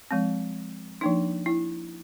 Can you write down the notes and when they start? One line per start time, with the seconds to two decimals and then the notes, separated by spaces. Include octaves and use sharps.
0.11 F3 G#3 C4
1.01 F3 A#3 D4 D#4
1.46 E4